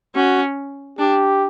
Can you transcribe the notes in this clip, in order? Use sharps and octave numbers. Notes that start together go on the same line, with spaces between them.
C#4 F#4
D4 G4